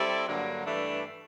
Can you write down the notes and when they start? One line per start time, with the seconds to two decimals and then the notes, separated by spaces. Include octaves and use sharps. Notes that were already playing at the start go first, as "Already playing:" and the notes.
Already playing: G3 C4 E4 A4 D5
0.27 G2 D3 F#3 A#3
0.65 G2 E3 A3 D4